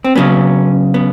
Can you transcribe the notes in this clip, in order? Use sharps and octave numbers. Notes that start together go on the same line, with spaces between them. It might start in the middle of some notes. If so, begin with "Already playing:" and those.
C4
C#3 F#3 B3 C#4
B3